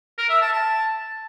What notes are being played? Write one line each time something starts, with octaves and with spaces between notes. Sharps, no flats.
A#4
E5
A5
A5